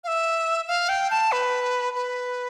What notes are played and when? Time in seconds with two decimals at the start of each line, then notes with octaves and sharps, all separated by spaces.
0.04 F5
0.08 E5
0.68 F5
0.89 G5
1.11 A5
1.32 B4
1.95 B4